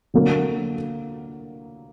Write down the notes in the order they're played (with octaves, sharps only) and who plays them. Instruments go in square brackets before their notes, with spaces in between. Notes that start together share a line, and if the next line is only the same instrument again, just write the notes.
[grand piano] D3 F#3 A#3